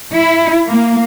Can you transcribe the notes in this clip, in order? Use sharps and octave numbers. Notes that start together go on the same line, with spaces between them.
E4
A#3